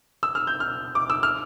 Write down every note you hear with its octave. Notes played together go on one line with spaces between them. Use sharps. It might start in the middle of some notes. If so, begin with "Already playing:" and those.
E6
F6
G6
F6
D6
E6
F6